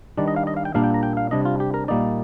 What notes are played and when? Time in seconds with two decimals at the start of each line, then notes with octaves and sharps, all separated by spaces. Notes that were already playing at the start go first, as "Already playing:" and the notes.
0.17 D#3 G3 D4 D5
0.28 D#5
0.36 F5
0.47 D#5
0.57 F5
0.65 G5
0.74 A#2 G3 A#3 D4 F5
0.84 G5
0.94 A#5
1.03 G5
1.17 F5
1.31 C3 G3 D4 D#5
1.45 F4
1.60 G4
1.74 A#4
1.88 A#2 G3 A#3 D#4 D5